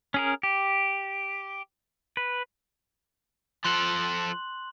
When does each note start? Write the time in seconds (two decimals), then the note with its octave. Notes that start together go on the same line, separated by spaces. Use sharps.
0.14 C#4 G#4 A#4
0.43 G4
2.17 B4
3.64 F3 A4 C6 F#6 F#7